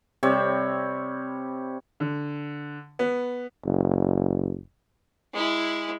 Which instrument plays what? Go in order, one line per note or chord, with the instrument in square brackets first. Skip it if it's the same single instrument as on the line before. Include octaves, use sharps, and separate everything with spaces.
[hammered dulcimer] C3 G3 C4 C#5
[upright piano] D3
B3
[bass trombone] F#1
[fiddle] G#3 E4